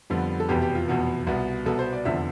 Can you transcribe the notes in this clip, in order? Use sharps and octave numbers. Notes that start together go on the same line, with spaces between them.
F2 D3 G3 B3
A4
F1 E2 B2 B3 G4
G4
F4
F1 E2 B2 B3
C2 B2 B3
C2 B2 B3 A4
C5
D5
F1 E2 D3 F3 E5